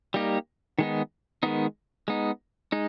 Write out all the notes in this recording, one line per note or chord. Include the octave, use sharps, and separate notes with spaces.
G3 A#3 D#4 G4
D#3 G#3 B3 D#4
D#3 G#3 B3 D#4
G#3 B3 D#4
G#3 D#4